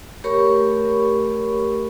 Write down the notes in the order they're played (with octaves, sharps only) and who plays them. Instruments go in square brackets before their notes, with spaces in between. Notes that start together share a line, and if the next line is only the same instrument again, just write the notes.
[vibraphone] A3 G4 A#4 C#5 B5 C#6